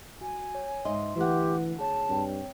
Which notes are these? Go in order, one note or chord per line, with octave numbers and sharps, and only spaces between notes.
F#4 G#5
C#5
G#2 D#5 E5 C6
D2 E3 G4 F#5
G#4 C#5 A5
G2 C4 C#5 G5